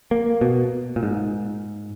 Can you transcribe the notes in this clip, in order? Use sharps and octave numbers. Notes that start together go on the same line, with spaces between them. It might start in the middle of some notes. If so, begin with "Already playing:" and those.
A#3
B2
A#2
G#2